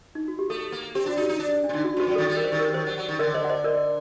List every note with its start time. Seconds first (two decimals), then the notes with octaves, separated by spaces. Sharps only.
0.15 D#4
0.28 F#4
0.39 G4
0.50 A3 A4
0.72 A#3
0.95 C4 G4
1.06 D4 F#4
1.17 D#4
1.21 G4
1.29 D#4
1.39 D4
1.64 D4
1.69 C3
1.73 D3 D#4
1.84 F#4
1.97 G2
2.00 F#4
2.07 F#2
2.15 D#3 A4
2.29 G3
2.37 A#4
2.44 C5
2.52 D#3
2.59 A#4
2.74 D#3 C5
2.86 F#3
2.98 F#3
3.08 D#3
3.19 D3 A#4 D5
3.34 C5 D#5
3.44 F#5
3.49 C5 D#5
3.64 A#4 D5